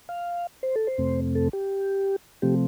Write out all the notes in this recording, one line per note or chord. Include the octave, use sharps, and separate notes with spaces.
F5
C5
A4
C5
F2 C3 A3 C4
A4
G4
C3 F3 A3 C4 G4